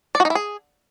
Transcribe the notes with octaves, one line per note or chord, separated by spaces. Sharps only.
D5
F#4
D#4
E4
G#4